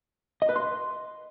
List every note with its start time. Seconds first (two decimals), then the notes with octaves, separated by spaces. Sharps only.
0.42 D#5
0.49 B4
0.56 C6